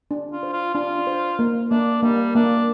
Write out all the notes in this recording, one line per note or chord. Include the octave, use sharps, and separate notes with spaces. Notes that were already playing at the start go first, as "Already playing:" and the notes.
D4
F4
C5
F4
D4 F4
C5
A#3
A#3 D4
G3 A#3
A#3 D4